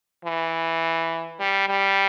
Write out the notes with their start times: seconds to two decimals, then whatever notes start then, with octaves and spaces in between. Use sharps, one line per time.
0.25 E3
1.40 G3
1.68 G3